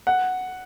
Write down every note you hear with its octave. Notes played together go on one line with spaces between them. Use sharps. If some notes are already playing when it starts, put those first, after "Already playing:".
F#5